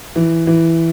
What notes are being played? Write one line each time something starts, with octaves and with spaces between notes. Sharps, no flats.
E3
E3